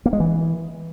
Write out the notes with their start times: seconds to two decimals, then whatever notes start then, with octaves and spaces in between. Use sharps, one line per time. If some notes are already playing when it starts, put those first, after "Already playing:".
0.06 A#3
0.13 G#3
0.20 E3